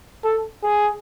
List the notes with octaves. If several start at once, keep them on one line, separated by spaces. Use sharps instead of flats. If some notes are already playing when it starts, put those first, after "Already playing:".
A4
G#4